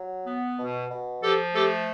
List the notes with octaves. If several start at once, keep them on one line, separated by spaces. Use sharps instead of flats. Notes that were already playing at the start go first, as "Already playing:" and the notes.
Already playing: F#3
B3
B2
B2
F3 G4 A4
A3 G4 A4